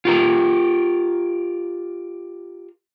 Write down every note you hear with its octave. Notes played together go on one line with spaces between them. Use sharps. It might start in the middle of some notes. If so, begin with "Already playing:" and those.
F4 G4 A#4